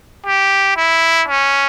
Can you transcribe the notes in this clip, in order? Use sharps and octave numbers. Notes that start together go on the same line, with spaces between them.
G4
E4
C#4